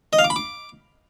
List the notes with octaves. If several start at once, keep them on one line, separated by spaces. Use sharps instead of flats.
D#5
F5
D6
B5
D6